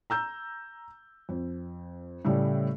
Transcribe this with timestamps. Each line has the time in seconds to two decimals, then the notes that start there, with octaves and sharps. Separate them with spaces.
0.10 A#5 E6 G6
1.29 F2
2.25 A2 C#3 G3 A3